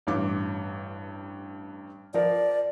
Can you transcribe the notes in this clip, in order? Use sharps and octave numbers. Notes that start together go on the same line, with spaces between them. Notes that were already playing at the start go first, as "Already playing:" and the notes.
A1 G2 D6
F3 A#4 D5